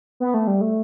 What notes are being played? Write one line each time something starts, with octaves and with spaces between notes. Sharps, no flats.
B3
A3
G3
A3